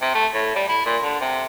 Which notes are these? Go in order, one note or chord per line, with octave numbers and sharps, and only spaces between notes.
C3
A3
A2
G3
E4
A#2
D3
C3